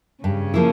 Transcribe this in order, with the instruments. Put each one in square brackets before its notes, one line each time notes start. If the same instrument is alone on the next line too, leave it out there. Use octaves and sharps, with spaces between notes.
[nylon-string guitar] G2 [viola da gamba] C#3 C#4
[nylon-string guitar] F3 A#3 E4 G#4